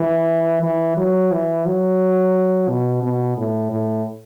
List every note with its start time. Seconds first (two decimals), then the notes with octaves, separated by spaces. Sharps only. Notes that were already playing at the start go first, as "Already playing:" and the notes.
Already playing: E3
0.63 E3
0.97 F#3
1.31 E3
1.66 F#3
2.69 B2
3.03 B2
3.37 A2
3.71 A2